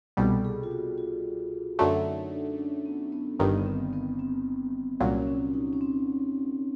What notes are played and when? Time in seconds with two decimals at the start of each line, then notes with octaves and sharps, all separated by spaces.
0.17 C2 B2 G3 A4
0.45 G#4
0.63 F4
0.71 F#4
0.98 F4
1.79 F#2 D3 F#3 A3
2.05 D#4
2.32 D4
2.54 C#4
2.59 D4
2.86 B3
3.12 B3
3.39 G1 G2 D#3 B3
3.58 B3
3.66 C4
3.93 B3
4.19 C4
5.00 C2 A#2 F#3 C#4
5.22 C#4
5.27 C4
5.54 D#4
5.73 C#4
5.81 C4